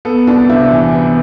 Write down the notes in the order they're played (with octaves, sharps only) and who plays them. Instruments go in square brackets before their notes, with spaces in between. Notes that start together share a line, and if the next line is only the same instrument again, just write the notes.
[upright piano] B3 A4
C2 D4
C3 E4
E3
B3